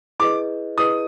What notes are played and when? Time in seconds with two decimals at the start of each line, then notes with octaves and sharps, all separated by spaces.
0.19 E4 G#4 B4 D#5 D6
0.77 E4 G#4 B4 D#5 D#6